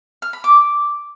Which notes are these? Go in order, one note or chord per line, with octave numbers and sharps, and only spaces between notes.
F6
B5
D6